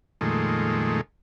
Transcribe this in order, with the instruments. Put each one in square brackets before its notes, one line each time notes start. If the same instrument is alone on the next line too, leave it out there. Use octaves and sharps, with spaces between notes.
[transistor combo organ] F2 A#2 D#3 G#3 A3